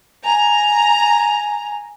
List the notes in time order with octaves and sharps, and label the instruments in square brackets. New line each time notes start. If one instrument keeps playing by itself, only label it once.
[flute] G#5 [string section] A#5